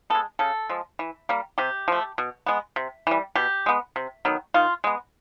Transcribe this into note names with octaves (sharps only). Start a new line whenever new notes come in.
G#3 B3 A4
C#3 A4
F3 G#3
E3
G3 A#3
C3 G4
F3 A3
B2
G#3 B3
C3
E3 G3
B2 G4
G#3 B3
C3
D#3 F#3 B3
D#3 F4
G#3 B3